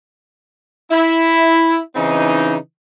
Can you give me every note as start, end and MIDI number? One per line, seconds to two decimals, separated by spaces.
0.91 1.78 64
1.95 2.55 49
1.95 2.55 52
1.95 2.55 60
1.95 2.55 63